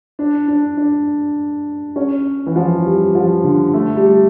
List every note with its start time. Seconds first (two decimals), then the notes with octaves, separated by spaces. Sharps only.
0.19 D4
0.48 D4
0.77 D4
1.96 C#4
2.46 E3
2.56 F3
2.86 G3
3.15 F3
3.44 D3
3.74 A3
3.96 G3